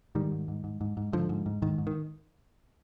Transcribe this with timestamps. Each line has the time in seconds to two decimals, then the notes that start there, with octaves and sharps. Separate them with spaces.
0.15 G#2 D#3 G3
0.32 G#2
0.48 G#2
0.64 G#2
0.81 G#2
0.97 G#2
1.13 G#2 D3 F3
1.29 G#2
1.46 G#2
1.62 G#2 D#3
1.78 G#2
1.87 D#3